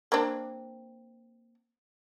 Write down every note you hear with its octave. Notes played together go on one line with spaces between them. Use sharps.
A#3 C4 D4